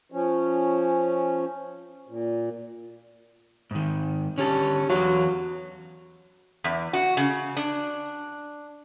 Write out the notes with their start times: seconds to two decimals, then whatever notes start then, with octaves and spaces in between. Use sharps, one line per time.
0.12 F3 C#4
2.08 A#2
3.71 G#2 D#3
4.38 D3 C#4 G4 A5
4.90 E2 F#3 F#4 F5
6.64 E2
6.93 F#4
7.17 C#3
7.57 D4